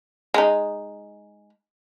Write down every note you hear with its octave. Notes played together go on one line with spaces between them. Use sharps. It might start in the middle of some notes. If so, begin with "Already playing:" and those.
G#3 D#4